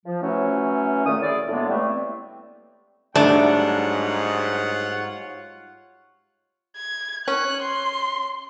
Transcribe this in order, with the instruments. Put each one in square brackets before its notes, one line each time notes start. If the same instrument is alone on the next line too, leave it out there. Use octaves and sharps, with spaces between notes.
[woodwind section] F3
E3 F#3 A3 C#4
F2 A#2 D#3 A3 D#6
C#4 E4 G#4 D5
D2 A2 G#3 A#3 B3
E3 G3 A3 A#3 C4
[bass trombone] G#2 [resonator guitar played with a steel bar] F#3 G3 A3 [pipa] D4 [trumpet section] F4 C#5 F#5
[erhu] G#6
[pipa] C#4 [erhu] F#6
[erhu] C6